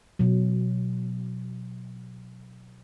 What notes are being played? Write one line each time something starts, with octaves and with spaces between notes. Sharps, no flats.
B2 F#3